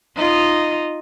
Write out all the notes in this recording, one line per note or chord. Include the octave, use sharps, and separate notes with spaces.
D#4 F4 D#5